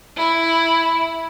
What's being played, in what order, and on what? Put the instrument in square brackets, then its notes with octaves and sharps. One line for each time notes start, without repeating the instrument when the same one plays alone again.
[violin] E4